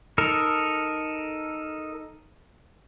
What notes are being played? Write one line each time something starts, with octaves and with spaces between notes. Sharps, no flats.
D#4 A4 A#4